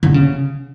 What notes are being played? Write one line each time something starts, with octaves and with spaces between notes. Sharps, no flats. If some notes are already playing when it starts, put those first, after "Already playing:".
D3
C#3